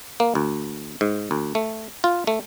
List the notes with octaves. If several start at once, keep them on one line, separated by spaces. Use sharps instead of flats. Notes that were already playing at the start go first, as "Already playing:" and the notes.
A#3
D2
G#2
D2
A3
F4
A3